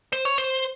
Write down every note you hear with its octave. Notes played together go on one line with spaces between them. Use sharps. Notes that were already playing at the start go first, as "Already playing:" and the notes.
C5
C#5
C5